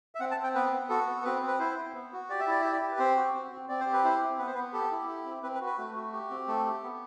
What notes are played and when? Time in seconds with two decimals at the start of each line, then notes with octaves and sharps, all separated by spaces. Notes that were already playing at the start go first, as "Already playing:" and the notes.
0.15 E5
0.20 C4 F#5
0.31 A5
0.37 C4
0.44 G5
0.55 B3 B4
0.72 B3
0.89 F#4 A4
1.07 B3
1.24 C4 B4
1.42 C4
1.47 B4
1.59 E4 C5
1.77 C4
1.94 B3
2.12 F#4
2.29 G4 D5
2.40 E5
2.47 E4 D5
2.61 G4 E5
2.73 D5
2.81 G4
2.92 B4
2.99 C4 C5
3.16 F#4
3.34 C4
3.51 C4
3.69 C4 D5
3.80 C5
3.87 G4
3.93 B4
4.04 E4 C5
4.21 C4
4.38 B3 B4
4.47 C5
4.54 B3 B4
4.73 G4 A4
4.91 E4
5.09 G4
5.26 C4
5.43 C4 B4
5.55 B4
5.61 F#4
5.66 B4
5.78 A3
5.95 F#4
6.13 G4
6.30 C4
6.48 A3 A4
6.65 G4
6.83 B3